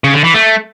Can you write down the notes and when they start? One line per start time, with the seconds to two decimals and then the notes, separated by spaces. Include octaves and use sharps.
0.04 C#3
0.14 D3
0.24 E3
0.34 A3